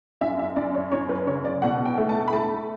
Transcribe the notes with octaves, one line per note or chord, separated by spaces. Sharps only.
F#2 E5
E5
F#2 D5
C#5
F#2 C#5
B4
C#3 C#5
D5
B2 F#5
G5
A3
A5
B5
A3 A5